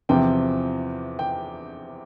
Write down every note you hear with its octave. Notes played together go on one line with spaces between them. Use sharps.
E2 C3 F3 C4 G5
G5